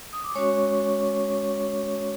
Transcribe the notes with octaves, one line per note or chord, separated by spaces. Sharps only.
D#6
D6
G#3 C#4 F#4 C#5 C#6